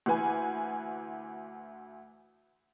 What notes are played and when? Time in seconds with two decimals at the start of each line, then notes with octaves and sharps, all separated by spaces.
0.06 D2 E3 B4 G#5